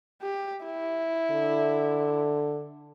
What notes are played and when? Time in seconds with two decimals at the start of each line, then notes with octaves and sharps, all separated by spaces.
0.22 G4
0.65 E4
1.31 D3